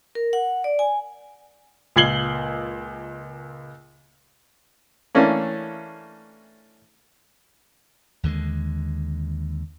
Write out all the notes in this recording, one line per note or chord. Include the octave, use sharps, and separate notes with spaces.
A#4
F#5
D5
G#5
C#2 A#2 G#6 C7 F#7 G7
E3 A3 A#3 C#4 D4
D#2 D3 F3 G#3